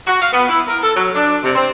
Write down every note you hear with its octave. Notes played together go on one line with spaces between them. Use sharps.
F#4
F5
B3
E4
A#4
A4
F#3
D4
C3
C4